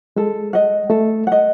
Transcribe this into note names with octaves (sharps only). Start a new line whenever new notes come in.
G#3 A4
D#5 F#5
A3 A4
D#5 F#5